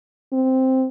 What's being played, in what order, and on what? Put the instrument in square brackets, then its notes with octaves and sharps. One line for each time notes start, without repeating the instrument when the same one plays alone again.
[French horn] C4